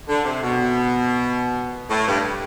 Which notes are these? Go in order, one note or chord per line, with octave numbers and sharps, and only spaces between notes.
D3
C3
B2
A2
G2